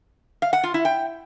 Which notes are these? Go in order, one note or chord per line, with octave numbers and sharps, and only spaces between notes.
F5
F#5
F4
E4
G5